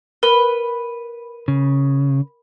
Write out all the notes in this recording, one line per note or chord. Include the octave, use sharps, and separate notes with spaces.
A#4 B4
C#3